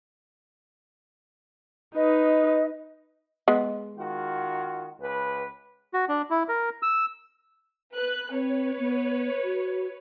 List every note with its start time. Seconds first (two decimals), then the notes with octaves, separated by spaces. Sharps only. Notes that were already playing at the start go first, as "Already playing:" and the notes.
1.96 D#4 B4 D#5
3.48 G#3 B3
3.97 D#3 F4 F#4
5.00 C#2 B4
5.93 F#4
6.09 D4
6.30 E4
6.49 A#4
6.82 E6
7.93 B4 F#6
8.31 C4 B4 C#5
8.79 B3
9.44 F#4